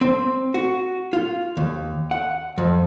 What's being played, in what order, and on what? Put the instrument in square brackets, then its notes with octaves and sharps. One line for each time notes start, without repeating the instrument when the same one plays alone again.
[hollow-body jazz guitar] C4
F#4
F4
D#2
F#5
F2